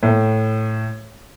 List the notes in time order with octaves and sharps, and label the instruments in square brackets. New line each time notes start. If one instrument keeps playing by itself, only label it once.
[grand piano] A2